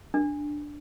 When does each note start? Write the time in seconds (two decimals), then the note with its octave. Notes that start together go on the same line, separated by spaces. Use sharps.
0.14 D4